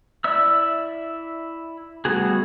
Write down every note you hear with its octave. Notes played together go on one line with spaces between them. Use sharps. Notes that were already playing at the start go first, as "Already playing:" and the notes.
E4 D5 E5 E6
G3 A3 B3 F#4 G#4